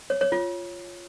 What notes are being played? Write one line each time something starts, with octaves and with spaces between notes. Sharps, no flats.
C#5
C#5
F4